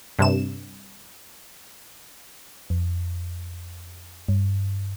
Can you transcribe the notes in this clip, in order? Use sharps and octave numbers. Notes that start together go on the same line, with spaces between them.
G2 C3 E7
F2
G2